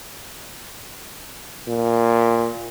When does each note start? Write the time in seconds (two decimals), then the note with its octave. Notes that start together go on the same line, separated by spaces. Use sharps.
1.68 A#2